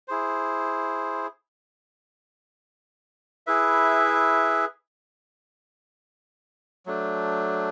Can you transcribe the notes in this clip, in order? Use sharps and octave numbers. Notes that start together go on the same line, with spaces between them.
E4 G#4 C5
E4 G#4 B4 E5
F#3 A3 D4